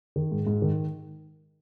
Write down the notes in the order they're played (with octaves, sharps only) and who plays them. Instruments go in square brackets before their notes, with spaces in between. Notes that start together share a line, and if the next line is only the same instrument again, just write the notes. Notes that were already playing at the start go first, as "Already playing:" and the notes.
[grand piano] D#3
G#2
G#2
D#3